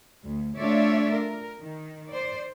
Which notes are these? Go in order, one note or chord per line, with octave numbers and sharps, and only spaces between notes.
D2
A3 D4 F4 C#5 D5 E5
A#4
D#3
C5 D5